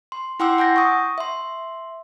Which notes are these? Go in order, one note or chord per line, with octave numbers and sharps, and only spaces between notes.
C6
E4 F#5 G5 C6 D6 E6
F#5 G#5 G6 A#6
C#6 D#6
E5 C6